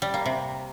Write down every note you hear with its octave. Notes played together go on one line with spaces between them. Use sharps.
G3
A#3
C3